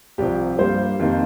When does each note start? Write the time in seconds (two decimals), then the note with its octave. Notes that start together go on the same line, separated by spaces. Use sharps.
0.18 C2 C3 F3 G4
0.59 G2 G3 A#3 C5
1.00 F2 D#3 A#3